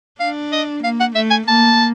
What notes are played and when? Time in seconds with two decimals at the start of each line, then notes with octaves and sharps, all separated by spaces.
0.20 D4 F5
0.52 D#5
0.84 A#3 F5
1.00 F#5
1.15 A3 E5
1.31 G#5
1.48 A#3 A5